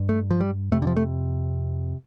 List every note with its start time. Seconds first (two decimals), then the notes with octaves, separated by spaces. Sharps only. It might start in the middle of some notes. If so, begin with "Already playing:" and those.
Already playing: G2
0.09 A3
0.31 F3
0.40 G3
0.72 F2 C3 A3
0.82 D3
0.87 F3
0.97 A3